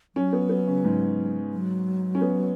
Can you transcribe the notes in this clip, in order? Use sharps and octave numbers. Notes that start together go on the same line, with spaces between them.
F#3 C#4
B3
B3
C#3
G#2
F#3
C#4
B3